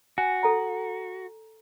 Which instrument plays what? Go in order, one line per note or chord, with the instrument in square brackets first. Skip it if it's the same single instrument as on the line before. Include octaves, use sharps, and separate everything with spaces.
[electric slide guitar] F#4 [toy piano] G#5
[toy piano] A4 A#5